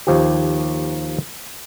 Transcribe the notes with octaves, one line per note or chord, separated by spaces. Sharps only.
D#2 F3 G4